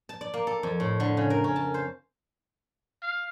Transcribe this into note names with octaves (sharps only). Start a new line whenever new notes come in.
A5
D5
A#3
A4
F2
A2
D3
C#3
A#4
C#4
A5
C5
F5